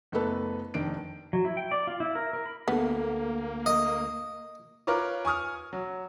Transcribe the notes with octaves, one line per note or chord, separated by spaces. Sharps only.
F#1 A3 B3 A4 B4
F1 D#3 D4 D7
F#3
E4
G5
D5
F4
E4
A#4
A#4
B5
D2 A#3 B3 A4
D#5
F4 A#4 B4 C#5 D6
G#5 C#6 D#6 F6
F#3